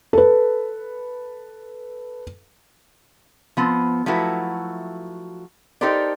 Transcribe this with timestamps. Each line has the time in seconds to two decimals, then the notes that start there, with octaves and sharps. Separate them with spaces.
0.13 A4 B4
3.57 F3 B3 C4
4.06 F3 F#3 A3 E4 F#4 B4
5.81 D#4 G4 A4 A#4 C5 D5